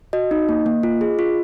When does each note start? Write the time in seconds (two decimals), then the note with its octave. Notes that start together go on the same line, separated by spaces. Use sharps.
0.13 F#4 D#5
0.31 D#4
0.49 A#3
0.66 A#3
0.83 F4
1.01 G#4
1.19 F4